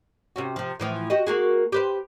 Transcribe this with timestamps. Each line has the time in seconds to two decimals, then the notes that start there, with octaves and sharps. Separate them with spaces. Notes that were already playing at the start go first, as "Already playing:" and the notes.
0.36 C3 C#4 F#4
0.56 C3 F3
0.80 A2 E3 F3
1.10 F#4 G4 D#5
1.27 A#3 F#4 G#4
1.72 G4 B4 C5